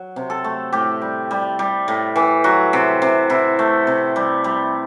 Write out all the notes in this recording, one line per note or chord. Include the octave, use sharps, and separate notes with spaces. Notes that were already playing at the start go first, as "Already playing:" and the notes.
Already playing: F#3
C3
A4
A3
A2 G4
G3
G3
G3
A2
E3
F#3 F#4
C3
C3
C3 E4
A3
C3
G3
G3